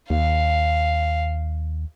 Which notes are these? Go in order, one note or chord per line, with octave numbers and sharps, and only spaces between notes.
D#2 F5